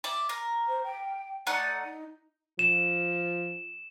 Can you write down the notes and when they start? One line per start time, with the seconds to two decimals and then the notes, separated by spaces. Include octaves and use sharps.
0.04 D5 E5
0.29 A#4
0.67 C5
0.83 G5
1.47 A3 D#4 D5 F#5
1.83 D#4
2.59 F3 E7